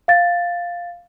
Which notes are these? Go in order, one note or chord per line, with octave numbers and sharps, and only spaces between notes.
F5 A6